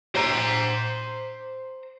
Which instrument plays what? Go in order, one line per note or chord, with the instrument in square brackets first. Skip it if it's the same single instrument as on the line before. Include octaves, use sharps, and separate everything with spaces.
[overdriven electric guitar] C5 A#5